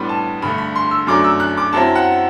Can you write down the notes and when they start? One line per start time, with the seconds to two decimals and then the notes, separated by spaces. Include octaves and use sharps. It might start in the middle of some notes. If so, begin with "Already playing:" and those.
Already playing: A2 G3 B3 D4 B5 C6
0.09 A5
0.42 G2 D3 A3 B5
0.58 B5
0.75 C6
0.91 E6
1.07 F#2 F#3 A3 D4 D6
1.24 E6
1.40 F#6
1.57 D6
1.73 F#2 F#3 C4 E4 A5
1.95 F#5